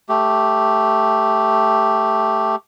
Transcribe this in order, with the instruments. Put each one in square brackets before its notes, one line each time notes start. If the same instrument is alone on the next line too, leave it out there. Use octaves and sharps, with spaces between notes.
[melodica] A3 G4